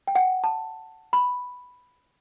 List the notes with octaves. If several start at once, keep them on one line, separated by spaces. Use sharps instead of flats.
G5
F#5
A5
B5